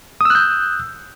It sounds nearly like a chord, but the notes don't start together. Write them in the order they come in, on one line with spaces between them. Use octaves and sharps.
D#6 E6 F#6 G6